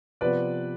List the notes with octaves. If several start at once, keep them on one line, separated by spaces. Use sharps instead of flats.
C3 F3 B3 F4 B4 D5